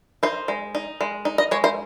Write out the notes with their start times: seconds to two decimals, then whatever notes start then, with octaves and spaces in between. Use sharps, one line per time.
0.23 D#4 C5
0.48 G#3
0.75 D#4
1.01 G#3
1.25 D#4
1.38 D#5
1.51 G#3 C#5
1.64 C5